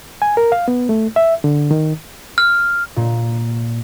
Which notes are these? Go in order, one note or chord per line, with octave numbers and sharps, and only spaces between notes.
G#5
A#4
F5
B3
A3
E5
D3
D#3
F6
A#2